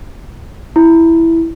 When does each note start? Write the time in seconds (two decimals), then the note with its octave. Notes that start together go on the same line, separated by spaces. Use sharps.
0.76 E4